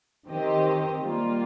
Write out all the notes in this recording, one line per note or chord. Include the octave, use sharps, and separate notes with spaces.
D#3 C4 G4 D#5
G3 A#3 F4